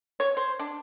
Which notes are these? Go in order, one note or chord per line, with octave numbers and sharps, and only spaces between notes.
C#5
C5
D4